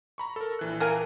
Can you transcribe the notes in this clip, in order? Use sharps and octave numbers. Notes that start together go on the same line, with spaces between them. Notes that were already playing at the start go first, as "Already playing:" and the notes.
A#5 B5 C#6
A4 A#4
A#1 E3 F#6
A#3 A#4 G#5